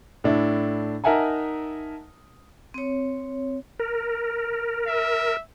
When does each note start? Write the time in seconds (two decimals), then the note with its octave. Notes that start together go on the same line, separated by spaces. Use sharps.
0.24 A2 D4 E4
1.04 D#4 A#4 E5 F#5 G#5 A5
2.74 C4 C#5
3.80 A#4
4.87 E5